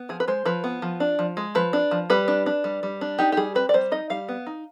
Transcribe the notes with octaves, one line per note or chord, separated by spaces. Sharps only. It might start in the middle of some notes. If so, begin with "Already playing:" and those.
Already playing: B3
F3 G#4
B4
G#3 C5
F3 B4
B3
F3
D4
F3
G#3
F3 B4
D4
F3
G3 B4
D4
D4
G3
G3
D4
D#4 G4
G4
G3 G#4
C4 B4
D5
G3 C5
D#4 D#5
G3 F5
B3
D#4